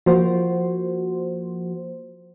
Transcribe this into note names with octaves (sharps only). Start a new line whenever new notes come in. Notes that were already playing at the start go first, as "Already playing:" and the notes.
F3 A#3 F#4 C5